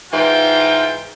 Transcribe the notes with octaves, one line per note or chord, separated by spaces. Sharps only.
G#2 E3 F4 G5